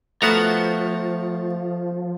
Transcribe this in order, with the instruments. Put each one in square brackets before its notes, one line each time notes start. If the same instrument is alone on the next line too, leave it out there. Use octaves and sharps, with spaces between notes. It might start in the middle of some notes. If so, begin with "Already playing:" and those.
[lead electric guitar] F3 [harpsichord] A3 F5 F#5 [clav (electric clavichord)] B3 F#4 A#5